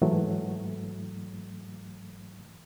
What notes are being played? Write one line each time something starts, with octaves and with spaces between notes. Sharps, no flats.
G#2 E3 F#3 A3